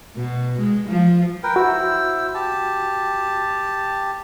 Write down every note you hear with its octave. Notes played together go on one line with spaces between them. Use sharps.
B2
G#3
F3
A#4 B4 G5
E4 F#4 C5 E6
G4 A5